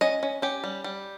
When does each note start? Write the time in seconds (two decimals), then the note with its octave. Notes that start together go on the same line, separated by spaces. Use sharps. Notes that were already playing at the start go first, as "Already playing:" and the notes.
0.01 C#4 D#5
0.23 C#4
0.42 C#4 G4
0.64 G3
0.84 G3